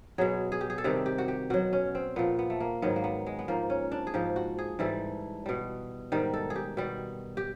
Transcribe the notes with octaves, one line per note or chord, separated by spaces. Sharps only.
B2 F#3 G#4
G#4
G4
G#4
A4
C3 D#3 G3 G#4
G4
F#4
G4
B2 F#3 F#4
C#4
C4
A#2 F3 B3
B3
A3
A#3
G#2 D#3 F#3 B3
A#3
B3
G#3
B3
G#2 F3 A#3
C#4
D4
G#4
G#2 F3 G4
F#4
G#4
G#2 E3 G3 A4
B2 G3
G#2 D#3 G3
A4
G#4
G4
B2 G3
G4